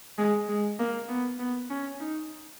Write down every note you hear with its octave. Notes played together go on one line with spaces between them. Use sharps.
G#3
G#3
A#3
B3
B3
C#4
D#4